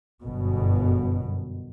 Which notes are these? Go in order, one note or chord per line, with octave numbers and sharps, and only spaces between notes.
G1 F#2 B2